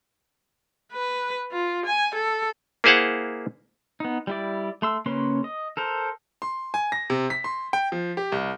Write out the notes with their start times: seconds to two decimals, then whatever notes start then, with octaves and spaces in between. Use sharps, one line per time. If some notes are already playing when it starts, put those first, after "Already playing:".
0.92 B4
1.51 F4
1.86 G#5
2.15 A4
2.84 A#3 E4 G#4 C5 F5 F#5
4.00 B3 D#4
4.27 G3 E4 D5
4.82 A3 C6 E6
5.06 C#3 A#3 C#4 B4 C6
5.44 D#5
5.77 A4 A#4 C5
6.42 C6
6.74 G#5
6.92 A#6
7.10 C3
7.30 B6
7.44 C6
7.73 G5
7.92 F3
8.17 G4
8.32 C2